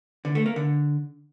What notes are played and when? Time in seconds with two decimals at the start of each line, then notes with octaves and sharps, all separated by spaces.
0.25 D3
0.35 A3
0.46 A#3
0.56 D3